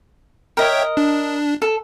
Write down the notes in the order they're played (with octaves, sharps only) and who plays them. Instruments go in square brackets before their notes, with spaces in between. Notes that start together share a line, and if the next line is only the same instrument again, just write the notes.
[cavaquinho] A#4 D#5 [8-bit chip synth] C#5 E5 G5
[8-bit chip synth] D4
[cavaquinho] A4